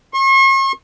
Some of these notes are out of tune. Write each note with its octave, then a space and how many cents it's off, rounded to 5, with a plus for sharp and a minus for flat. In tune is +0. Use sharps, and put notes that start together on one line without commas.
C#6 -45